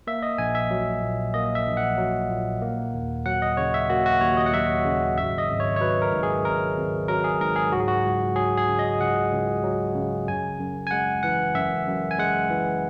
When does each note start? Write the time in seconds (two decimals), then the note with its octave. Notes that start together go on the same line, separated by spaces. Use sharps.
0.07 A#3 E5
0.22 D#5
0.38 A#1 G#5
0.55 E5
0.71 F#3
1.02 A#2
1.34 A#3 D#5
1.55 E5
1.67 A#1
1.77 F#5
1.98 F#3
2.30 A#2
2.62 A#3
2.94 D#2
3.26 F#3 F#5
3.42 D#5
3.57 C#3 C#5
3.74 E5
3.90 A#3 F#4
4.06 F#4
4.21 D#2 C#5
4.37 D#5
4.46 F#5
4.53 F#3 E5
4.85 C#3
5.17 G#1 E5
5.38 D#5
5.50 G#1
5.60 C#5
5.76 C#5
5.80 F#3 B4
6.02 A#4
6.12 G#2
6.23 G#4
6.45 G#1 A#4
6.77 G#1
7.08 F#3 A#4
7.24 G#4
7.40 G#2 A#4
7.56 G#4
7.72 C#2 F#4
7.80 G#4
7.88 F#4
8.05 C#2
8.36 F#3 G#4
8.57 G#4
8.68 C#3
8.79 D#5
9.00 C#2 F#5
9.32 C#2
9.63 F#3
9.95 C#3
10.27 F#2 G#5
10.59 F#2
10.87 G#5
10.91 G#3 F#5
11.23 E3 F#5
11.55 F#2 E5
11.87 F#2
12.11 G#5
12.18 G#3 F#5
12.50 E3